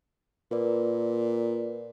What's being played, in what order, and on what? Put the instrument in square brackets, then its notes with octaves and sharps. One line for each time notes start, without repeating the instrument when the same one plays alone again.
[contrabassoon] A#2 [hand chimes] A#4 B4 D5